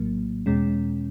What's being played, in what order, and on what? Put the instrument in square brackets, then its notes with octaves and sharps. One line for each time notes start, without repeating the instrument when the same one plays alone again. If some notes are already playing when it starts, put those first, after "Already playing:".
Already playing: [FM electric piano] A#1 A2 F#3 A#3
E2 B2 G#3 C#4